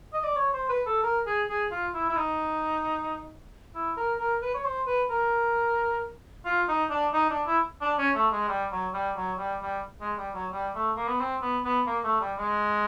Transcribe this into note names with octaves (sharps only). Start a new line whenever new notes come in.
D#5
D5
C#5
C5
B4
A4
A#4
G#4
G#4
F4
E4
E4
D#4
E4
A#4
A#4
B4
C#5
C5
B4
A#4
F4
D#4
D4
D#4
D4
E4
D4
C#4
A3
G#3
G3
F#3
G3
F#3
G3
G3
G#3
G3
F#3
G3
A3
A#3
B3
C4
B3
B3
A#3
A3
G3
G#3